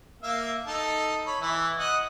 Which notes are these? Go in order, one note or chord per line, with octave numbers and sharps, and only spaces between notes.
A#3 E5 F5
D#4 A4 A5
C#5 B5
E3 E5
D#5 F#5